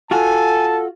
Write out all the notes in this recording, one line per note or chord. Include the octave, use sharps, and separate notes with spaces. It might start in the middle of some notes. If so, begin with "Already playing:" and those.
F4 F#4 A4 G#5 A5